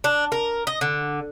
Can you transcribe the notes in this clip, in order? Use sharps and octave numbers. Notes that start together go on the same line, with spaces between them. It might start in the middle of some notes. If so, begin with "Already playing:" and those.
D4
A#4
D#5
D3